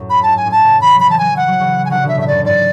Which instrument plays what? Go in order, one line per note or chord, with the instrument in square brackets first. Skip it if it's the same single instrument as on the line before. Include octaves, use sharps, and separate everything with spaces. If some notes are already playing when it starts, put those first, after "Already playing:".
Already playing: [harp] F#2 A2
[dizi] B5
[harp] G#2 [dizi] A5
[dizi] G#5
[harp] F#2 A2
[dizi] A5
[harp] A2 C#3
[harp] E3 [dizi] B5
[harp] F#3
[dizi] B5
[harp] E3 [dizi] A5
[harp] F#3 [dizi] G#5
[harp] E3 [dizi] F#5
[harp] F#3
C#3 E3
[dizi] G#5
[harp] D3 F#3 [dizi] F#5
[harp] B2 D3 [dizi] E5
[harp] A2 C#3 [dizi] E5
[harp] F#2 [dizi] D5
[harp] G#2 [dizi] D5